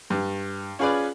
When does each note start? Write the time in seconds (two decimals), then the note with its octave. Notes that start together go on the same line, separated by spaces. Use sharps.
0.10 G2
0.79 C#4 F4 G#4 B4 D5